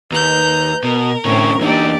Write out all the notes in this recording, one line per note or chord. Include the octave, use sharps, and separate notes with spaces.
D#2 B4 A#5 G6
B2 A#4
A2 D3 C4 C#4 C#6
E2 A#3 D4 D#4 G4 D5